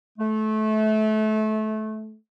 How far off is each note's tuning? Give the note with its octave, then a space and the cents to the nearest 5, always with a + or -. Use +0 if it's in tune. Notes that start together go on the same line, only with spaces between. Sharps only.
A3 -25